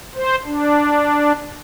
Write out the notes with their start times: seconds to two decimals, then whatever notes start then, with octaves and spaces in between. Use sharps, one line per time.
0.15 C5
0.45 D4